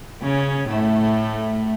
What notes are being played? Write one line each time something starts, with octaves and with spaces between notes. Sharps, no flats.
C#3 C#4
A2 A3